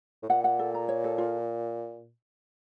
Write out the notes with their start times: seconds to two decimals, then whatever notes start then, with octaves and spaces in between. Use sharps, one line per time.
0.23 A2
0.29 A#2 F#5
0.44 F#5
0.59 A4
0.74 A#5
0.89 C#5
1.04 A4
1.18 F4